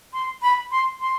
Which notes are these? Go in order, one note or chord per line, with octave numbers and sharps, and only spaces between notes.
C6
B5
C6
C6